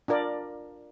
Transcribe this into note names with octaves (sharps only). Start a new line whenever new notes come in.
D4 F4 A#4 D5